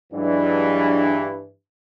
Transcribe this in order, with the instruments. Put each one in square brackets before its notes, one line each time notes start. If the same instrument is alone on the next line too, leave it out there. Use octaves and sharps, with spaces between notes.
[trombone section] G2 E3 [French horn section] F#3 G#3 D4